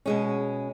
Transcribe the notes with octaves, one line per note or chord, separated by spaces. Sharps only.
B2 G#3 C#4